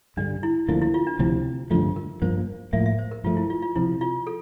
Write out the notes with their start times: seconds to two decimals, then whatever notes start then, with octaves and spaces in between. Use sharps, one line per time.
0.17 G2 D3 G3 D4
0.43 E4
0.68 D2 D3 F3 A#3 E4
0.82 E4
0.94 F4
1.07 D4
1.19 D2 C3 F3 C4 E4
1.71 G2 D3 F3 A3 F4
1.96 A#4
2.22 G2 F3 A#3 C5
2.73 A2 F3 A#3 E5
2.86 E5
2.99 C5
3.11 A#4
3.24 G2 F3 A3 F4
3.37 E4
3.50 F4
3.62 F4
3.76 C3 F3 C4 E4
4.01 F4
4.27 A4